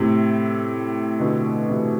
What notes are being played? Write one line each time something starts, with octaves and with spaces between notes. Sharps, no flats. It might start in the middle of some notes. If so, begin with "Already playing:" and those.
Already playing: A2 C3
B2 D3
C3 E3